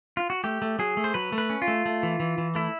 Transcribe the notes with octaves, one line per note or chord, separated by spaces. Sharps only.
F4
F#4
A3 G4
A3
F#3 G#4
A3
C5
F#3 B4
A3
B4
C#4
F4
A3
A3
E3
E3
E3
A3 E4